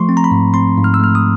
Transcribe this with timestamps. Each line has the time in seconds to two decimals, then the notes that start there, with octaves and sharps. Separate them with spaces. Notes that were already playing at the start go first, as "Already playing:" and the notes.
Already playing: F3 A3 C6 C#6
0.09 C4
0.17 A#5
0.24 B5
0.31 G#2
0.54 C4 C6
0.77 G#2
0.84 F6
0.94 E6
1.00 A3 F6
1.15 D#6